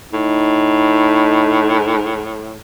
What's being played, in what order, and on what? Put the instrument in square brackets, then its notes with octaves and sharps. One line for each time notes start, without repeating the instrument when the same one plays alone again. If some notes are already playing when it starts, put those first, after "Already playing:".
[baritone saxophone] A2 [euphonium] D#4